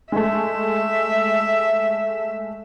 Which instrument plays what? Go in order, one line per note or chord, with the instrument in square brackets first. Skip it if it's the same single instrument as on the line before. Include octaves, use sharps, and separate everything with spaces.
[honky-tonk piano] G#3 A3 [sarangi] E5